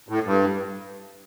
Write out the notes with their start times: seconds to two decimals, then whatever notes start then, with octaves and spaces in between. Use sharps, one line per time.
0.09 A2
0.24 G2